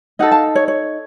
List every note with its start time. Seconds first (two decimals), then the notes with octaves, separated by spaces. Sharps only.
0.19 D#4 A4 D#5 F#5
0.31 F5 A5
0.56 C#5
0.68 C#5